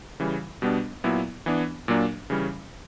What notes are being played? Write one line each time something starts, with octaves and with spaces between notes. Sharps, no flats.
C#3 E3 G3
B2 G3 B3 D4
A#2 F#3 B3 E4
E3 B3 D4
A#2 F#3 A#3 D4
C#3 E3 G3 C#4